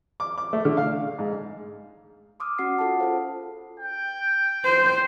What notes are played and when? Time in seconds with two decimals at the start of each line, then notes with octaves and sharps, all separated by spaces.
0.20 D6
0.38 D6
0.53 A3
0.65 D3
0.77 F5
1.19 G#2
2.40 C6 D6 D#6 F6
2.59 C#4 F#4 F#5 C7
2.79 F4 A4 F#5 A5
3.00 F4 G#4 A4 C5 F5
3.80 G5
4.64 C5